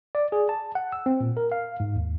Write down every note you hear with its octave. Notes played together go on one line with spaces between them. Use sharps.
D5
G#4
A5
F#5
E6
C4
A#2
A#4
F5
G#2
D#2